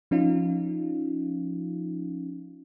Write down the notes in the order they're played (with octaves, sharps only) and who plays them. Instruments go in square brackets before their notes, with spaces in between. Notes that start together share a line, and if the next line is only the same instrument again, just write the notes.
[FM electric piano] F3 C#4 D#4 F4